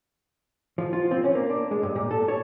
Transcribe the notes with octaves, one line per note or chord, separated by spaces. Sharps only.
F3
F4
C4
C#4
A#3
D4
G#3
G2
A#2
A4
C#5